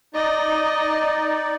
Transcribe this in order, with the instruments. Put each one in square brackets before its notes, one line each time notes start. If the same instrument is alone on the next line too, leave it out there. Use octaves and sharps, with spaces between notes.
[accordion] D#4 D5 [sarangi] D#5